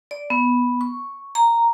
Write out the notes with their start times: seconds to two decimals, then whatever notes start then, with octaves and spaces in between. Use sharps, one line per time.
0.11 D5
0.30 B3
0.81 C#6
1.35 A#5